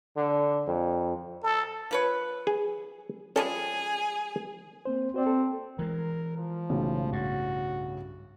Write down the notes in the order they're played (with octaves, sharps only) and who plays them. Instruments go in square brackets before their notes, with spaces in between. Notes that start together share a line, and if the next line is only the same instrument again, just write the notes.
[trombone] D3
F2
[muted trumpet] A4
[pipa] F3 B4 C#5
[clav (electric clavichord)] G#4
[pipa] F3 G3 G#3 [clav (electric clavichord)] C#4 A4 [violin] G#4 G#5
[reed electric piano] A#3 C4 C5
[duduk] C4 [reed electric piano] F#4 C5 D5
[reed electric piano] A4
[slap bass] E3 G#3 [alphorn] A#4
[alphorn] F3
[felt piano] B1 A2 C#3
[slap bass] G2 [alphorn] F#4